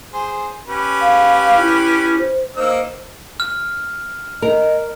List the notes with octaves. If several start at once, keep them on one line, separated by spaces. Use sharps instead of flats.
G#4 C5
C#4 G4 B4
F5
E4
C5
A#3 D#4 C5 E6
F6
A#4 D#5